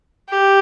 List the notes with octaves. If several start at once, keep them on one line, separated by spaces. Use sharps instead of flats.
G4